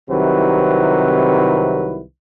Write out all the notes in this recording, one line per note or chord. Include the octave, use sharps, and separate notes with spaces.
C2 C3 D#3 F#3 E4 B4